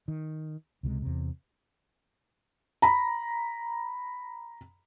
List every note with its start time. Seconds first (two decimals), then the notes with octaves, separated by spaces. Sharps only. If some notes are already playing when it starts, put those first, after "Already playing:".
0.08 D#3
0.83 C#2 C3 F3 G#3
1.02 E2 C3
2.82 A#5 B5